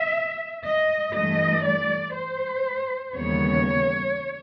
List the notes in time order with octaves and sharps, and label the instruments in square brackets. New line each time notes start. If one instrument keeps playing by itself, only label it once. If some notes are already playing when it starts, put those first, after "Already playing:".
Already playing: [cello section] E5
D#5
G2 E3 A3 D#5
D5
C5
D#2 C#3 E3 G3 B3 C#5